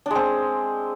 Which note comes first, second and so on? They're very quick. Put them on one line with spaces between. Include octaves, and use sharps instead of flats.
D4 G#3 C4